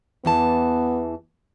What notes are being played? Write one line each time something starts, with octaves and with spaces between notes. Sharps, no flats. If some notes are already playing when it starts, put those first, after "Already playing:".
E2 E3 B3 A5